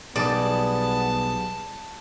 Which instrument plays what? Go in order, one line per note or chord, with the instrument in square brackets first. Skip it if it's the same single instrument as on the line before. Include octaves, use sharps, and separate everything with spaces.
[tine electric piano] B1 G3 G#4 [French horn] B3 [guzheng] D5 [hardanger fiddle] A5